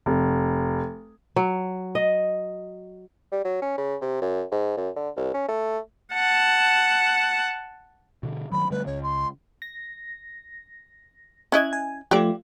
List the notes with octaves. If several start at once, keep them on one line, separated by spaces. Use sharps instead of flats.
F1
F#3
D#5
G3
F#3
C#4
C#3
C3
F#2
G#2
F#2
D3
C2
C#4
A3
F#5 A5
B2 D3
G2 D#3 F#3 B5
D3 G3 A3 B4
C#2 C#3 C#5
C6
A#6
C#4 E4 D#5 F#6 G#6
G#5
F3 A3 F4 G4 D5